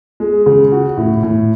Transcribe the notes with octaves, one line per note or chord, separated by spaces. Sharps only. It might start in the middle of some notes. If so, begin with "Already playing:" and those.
G#3
C#3
F#4
A2
A2